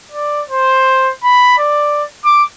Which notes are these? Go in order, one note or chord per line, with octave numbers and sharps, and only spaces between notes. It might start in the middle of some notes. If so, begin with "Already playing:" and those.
D5
C5
B5
D5
D6